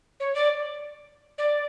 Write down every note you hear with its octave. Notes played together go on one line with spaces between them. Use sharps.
C#5
D5
D5